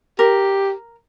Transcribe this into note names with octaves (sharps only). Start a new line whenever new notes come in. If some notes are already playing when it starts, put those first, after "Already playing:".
G4 A#4